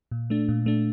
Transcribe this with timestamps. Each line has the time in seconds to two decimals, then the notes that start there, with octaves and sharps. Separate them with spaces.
0.11 A#2
0.30 A3 D4
0.49 A#2
0.66 A3 D4